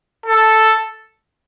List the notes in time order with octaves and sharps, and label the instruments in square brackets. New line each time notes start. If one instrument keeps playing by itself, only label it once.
[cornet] A4